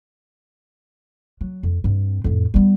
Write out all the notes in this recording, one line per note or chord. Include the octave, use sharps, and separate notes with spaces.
F#3
F2
G2 C4
F2 A2
G3 B3